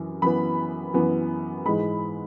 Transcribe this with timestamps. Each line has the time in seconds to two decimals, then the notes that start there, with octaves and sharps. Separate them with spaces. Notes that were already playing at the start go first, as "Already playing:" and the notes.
Already playing: F#2 E3
0.22 F#2 E3 B3 B5
0.94 F#2 E3 B3
1.66 G#2 E3 G#3 B5